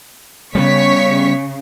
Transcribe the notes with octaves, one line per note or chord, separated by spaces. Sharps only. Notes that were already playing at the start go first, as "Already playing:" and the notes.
C#3 G3 G#3 B3 C#5 C#6 B6